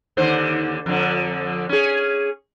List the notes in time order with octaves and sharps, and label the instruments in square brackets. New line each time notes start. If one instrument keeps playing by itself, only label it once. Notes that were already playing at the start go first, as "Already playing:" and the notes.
[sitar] D#2 D3 C5
F2 D3
C#4 G#4